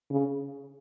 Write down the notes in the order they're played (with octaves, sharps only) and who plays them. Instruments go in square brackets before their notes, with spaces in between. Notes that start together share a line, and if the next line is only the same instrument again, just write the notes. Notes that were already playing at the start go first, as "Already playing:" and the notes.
[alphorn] C#3